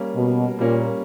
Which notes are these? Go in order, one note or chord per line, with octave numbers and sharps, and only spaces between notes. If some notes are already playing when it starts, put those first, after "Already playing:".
Already playing: G3 A#3 C#4
B2
A#2 G3 A#3 C#4